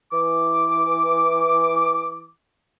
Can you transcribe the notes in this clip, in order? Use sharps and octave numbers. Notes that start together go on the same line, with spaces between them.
E3 D6